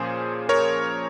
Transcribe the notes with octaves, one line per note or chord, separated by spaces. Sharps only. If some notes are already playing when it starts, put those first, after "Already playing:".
Already playing: A#2 F3 A#3 C#4 G#4 C5
A#4 C#5